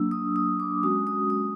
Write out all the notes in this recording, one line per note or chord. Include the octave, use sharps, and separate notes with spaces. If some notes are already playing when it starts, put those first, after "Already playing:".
Already playing: F#3 A#3 D4 E6
D#6
D#6
D6
G#3 C#4 F#4 D#6
D#6
D#6